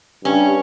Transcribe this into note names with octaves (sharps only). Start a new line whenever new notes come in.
G2 C#4